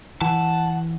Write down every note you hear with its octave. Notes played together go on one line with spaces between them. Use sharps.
E3 F#5 A5